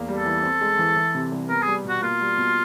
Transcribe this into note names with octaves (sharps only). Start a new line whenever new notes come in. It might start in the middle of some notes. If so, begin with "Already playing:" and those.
Already playing: E2 A#3
G3
A4
E3
C4
G#3
E3
E3
C3
C2
B3 A#4
G3 G#4
B2 F#4
A#3 F4
G3
B2